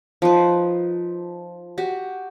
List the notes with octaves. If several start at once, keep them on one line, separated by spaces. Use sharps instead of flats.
F3 D#4 B4
F#4 G4